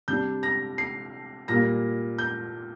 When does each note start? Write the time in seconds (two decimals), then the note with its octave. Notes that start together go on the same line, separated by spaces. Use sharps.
0.08 C3 G3 D4 G6
0.43 A#6
0.78 C7
1.48 A#2 G3 A#3 A#6
2.18 G6